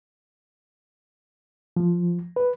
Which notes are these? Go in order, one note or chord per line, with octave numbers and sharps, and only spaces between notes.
F3
B4